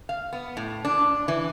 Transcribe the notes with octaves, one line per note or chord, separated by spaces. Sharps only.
F5
B3
A2
D4
E3